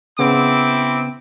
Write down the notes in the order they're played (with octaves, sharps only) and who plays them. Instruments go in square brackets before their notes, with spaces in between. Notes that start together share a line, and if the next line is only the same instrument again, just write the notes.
[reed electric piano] C#3 B3 [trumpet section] C4 E4 D6